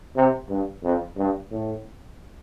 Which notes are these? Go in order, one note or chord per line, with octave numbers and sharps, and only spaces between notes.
C3
G2
F2
G2
A2